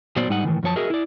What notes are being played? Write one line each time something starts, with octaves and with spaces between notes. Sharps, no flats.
A#2 F#3 B3 C5 D5
G#2 G3 D#4 D#5 F#5
A2 D#3 E3
F#2 F3 C#5 A5
F#4 G#4 A#4 D#5 E5
E4 D5